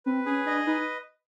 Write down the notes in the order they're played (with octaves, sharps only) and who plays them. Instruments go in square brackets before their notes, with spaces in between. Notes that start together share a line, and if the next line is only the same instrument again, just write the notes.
[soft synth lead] C4 [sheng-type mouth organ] B4
[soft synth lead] C#4 [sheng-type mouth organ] G#4
[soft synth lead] D4 [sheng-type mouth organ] D#5
[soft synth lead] D#4 [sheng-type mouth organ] B4